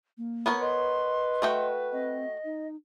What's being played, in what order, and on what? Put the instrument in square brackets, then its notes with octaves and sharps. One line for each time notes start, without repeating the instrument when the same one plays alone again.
[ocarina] A#3
[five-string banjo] B3 A#4 C#5
[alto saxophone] B4 [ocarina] D#5 [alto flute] C6
[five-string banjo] A3 F#4 G5
[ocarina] C4 [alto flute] D#5
[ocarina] D#4